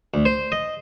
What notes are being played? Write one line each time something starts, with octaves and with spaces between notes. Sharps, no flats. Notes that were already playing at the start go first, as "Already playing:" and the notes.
D2
C5
D#5